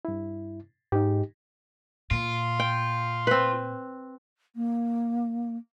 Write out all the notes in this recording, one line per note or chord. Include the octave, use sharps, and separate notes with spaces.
G2 E4
G#2 D#4 G4
A#2 F4
G5
C4 B4
A#3